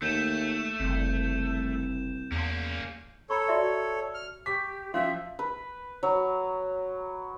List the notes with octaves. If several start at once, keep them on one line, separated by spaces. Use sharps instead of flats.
D#2 A3 G6 E7
F#1 C2
E2 A#3 C#4
A4 C#5 A#5 B5 C#6
F#4 D5 E5
F6
G4 C#6 D6 B6
F3 C#4 E5 F5 C6
B4
F#3